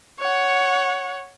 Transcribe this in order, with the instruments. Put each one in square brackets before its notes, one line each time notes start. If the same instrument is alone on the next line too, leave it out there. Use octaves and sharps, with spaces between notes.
[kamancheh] C#5 F#5